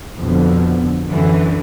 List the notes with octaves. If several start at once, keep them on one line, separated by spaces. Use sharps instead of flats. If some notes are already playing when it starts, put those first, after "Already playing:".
F2 B2 D3
F#2 D3 E3